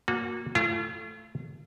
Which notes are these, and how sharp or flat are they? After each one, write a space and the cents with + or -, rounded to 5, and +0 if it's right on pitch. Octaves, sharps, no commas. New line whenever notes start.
A#3 +0 F#4 -30
A3 +0 F4 -40